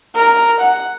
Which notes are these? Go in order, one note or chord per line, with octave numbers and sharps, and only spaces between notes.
A#4
F#5